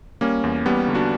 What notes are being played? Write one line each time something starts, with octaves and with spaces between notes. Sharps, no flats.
G3 A#3 C#4
E2
E2 G3 B3
D3
D4 F#4